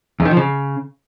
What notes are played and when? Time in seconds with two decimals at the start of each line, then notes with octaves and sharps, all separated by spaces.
0.20 E2
0.25 D#3
0.31 F3
0.37 C#3